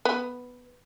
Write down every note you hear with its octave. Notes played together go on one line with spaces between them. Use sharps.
B3